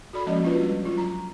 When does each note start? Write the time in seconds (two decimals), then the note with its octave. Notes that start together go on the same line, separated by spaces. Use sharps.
0.13 F#4 A4 D5 B5
0.26 F3 G#3 A#3 C#4 F#4 D#5
0.43 C#4 D4 F4 F#4 B4 C5
0.59 G3 G#3 B4
0.83 F#3 F4
0.98 A#5